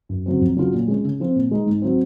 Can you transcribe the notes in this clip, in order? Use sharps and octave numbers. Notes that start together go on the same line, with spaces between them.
F#2
C#3 F#3 C4
F2
C#3 F#3 C#4 F4
A#2
G#3 C#4
C#3
F3 C4 F4
A#2
G#3 D#4
G#2
F#3 C4